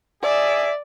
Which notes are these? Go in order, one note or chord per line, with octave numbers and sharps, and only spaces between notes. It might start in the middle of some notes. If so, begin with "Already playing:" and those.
G#4 D5 E5